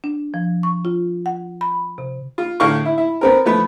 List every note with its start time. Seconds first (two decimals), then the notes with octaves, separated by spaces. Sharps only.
0.04 D4
0.34 F3
0.63 C#6
0.85 F4
1.26 F#5
1.61 B5
1.98 C3
2.38 F4
2.60 A2 D3 A3 F5 C#6
2.85 E4
2.98 E4
3.21 B3 C4 A#4
3.45 F3 A3 B3 B4